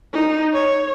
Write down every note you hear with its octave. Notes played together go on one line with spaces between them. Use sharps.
D#4
C#5